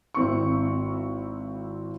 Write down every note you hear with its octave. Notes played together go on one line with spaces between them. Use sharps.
G#1 C4 E4 C#6